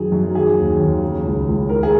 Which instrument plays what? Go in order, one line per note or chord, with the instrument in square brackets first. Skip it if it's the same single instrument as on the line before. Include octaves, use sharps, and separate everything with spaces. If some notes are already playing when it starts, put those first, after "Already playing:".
Already playing: [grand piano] F#2 D#3 G#4
F#2
D#3 G#4
D#2
D#2
C#3
C#2
C#2
D#3 A#4
G#4